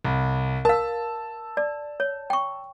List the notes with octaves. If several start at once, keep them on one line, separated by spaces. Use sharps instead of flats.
C2
A#4 F5 A5 E6
D5
C#5
G5 C#6